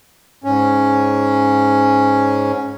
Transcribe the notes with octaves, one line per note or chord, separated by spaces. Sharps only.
G#2 C#4